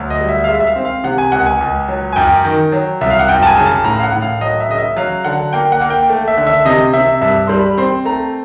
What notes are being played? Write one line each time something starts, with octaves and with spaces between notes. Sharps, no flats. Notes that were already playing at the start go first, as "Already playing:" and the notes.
Already playing: D2 F#3
D#5
G3
E5
F5
G#3 E5
E5
F5
C4
F5
C3 F#5
G#5
C#2 F#5
G#5
C#2
F#3
G#5
F#2 G5
D#3
F#3
C2 E5
F5
F#5
F#2 G5
A5
G#5
C#3
A5
A2 A#5
F5
F#5
A2
F5
F#3 D#5
E5
C#3 D#5
E5
F#3 F5
D3 F#5
A#3 G5
F#5
A#3
G5
A3
E5
D3
E5
C3 D#5
C3 E5
G2 E5
G3 C6
B5
C4 C6
A3 A#5